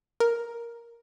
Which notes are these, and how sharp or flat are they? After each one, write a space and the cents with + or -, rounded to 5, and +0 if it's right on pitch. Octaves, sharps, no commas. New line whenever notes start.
A#4 +5